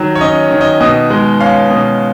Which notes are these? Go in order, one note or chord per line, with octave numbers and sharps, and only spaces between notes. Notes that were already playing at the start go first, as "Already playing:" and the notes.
Already playing: D#3 F#3
C#5
C#4 D#5
D#3
D#5
B2 D#5
G#3
C#4 F5
B2